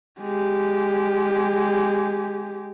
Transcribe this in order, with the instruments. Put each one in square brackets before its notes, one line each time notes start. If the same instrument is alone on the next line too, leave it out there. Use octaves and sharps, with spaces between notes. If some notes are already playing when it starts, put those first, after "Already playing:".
[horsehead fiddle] G#3 G4